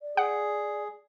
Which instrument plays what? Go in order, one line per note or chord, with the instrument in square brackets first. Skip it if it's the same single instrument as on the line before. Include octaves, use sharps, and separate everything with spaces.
[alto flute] D5
[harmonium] G#4 [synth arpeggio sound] F#5